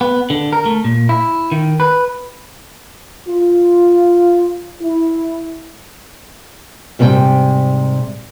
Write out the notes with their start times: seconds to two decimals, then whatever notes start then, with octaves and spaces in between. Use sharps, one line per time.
0.01 B3
0.30 D3
0.53 A#4
0.66 A3
0.84 A#2
1.09 E4
1.52 D#3
1.80 B4
3.28 F4
4.81 E4
6.99 G#2 C3 G3 A#4 G5